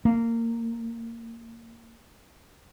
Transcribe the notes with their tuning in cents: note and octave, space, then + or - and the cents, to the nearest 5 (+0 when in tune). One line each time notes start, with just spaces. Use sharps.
A#3 -20